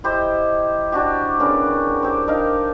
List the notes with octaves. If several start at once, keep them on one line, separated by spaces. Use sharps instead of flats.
E4 G4 C5 D#5
D4 F#4 G4
C#3 B3 D4 A#4
C4 G4
D4 D#4 A#4 F5